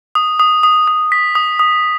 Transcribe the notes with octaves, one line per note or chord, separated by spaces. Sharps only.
D#6
D#6
D#6
D#6
B6
D#6
D#6